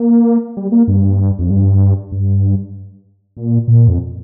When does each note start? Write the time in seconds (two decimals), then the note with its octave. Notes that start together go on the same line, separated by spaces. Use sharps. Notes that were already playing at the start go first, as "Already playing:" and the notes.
Already playing: A#3
0.57 G3
0.72 A#3
0.88 G2
1.39 F2
1.50 G2
2.12 G2
3.37 A#2
3.68 A#2
3.88 F2